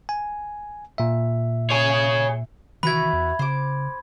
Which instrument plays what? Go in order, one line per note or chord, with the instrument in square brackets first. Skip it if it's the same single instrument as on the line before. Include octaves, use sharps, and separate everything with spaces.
[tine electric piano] G#5
A#2 E5
[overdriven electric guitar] G#4 C#5
[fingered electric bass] C3 D#3 E3 [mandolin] E4 F#4 B4 [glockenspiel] B5 G#6
[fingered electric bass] E2
[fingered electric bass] C#3 [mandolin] C5 D6